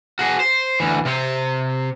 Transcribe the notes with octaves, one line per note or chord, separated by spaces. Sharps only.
F#4 G#4
C5
D2 E3
C3 C4